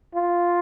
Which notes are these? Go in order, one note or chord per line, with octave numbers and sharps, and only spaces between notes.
F4